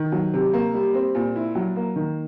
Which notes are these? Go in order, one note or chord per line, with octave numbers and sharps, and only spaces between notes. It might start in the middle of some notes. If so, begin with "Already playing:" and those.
Already playing: D#3
F#3
C3
A#3
G3
C4
A#2
E4
F#3
A#3
D#3